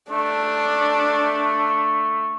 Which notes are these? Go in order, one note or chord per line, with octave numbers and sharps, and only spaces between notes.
A3 D4